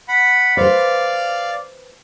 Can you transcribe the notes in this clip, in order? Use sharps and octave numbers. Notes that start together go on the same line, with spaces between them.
F#5 B5
B4 C5 D5 F5